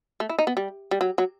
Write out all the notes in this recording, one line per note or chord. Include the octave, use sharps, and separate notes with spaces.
A3
E4
D#4
B3
G3
G3
F#3
F#3